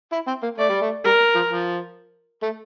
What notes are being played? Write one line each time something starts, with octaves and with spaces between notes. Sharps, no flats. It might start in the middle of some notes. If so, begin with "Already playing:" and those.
E4
C4
A#3
A3 D5
G3
A3
G3 A#4
F3
F3
A3